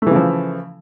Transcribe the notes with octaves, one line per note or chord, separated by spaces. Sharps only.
C#3 E3 F3 A3